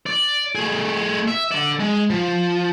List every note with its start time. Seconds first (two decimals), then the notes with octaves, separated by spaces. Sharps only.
0.06 D5
0.55 A3 G#4
1.28 E5
1.52 D3 D5
1.79 G#3
2.10 F3